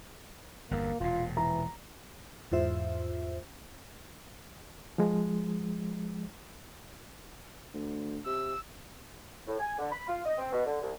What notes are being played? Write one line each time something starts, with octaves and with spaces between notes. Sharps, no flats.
G1 E2 G2 A#3
E1 A#2 F4
E3 A#5
E2 G#2 F4 C5 E5
F3 G#3
D2
C3 E6
A2
G#5
D3
B5
F4
D#5
C4
B2
D3
C2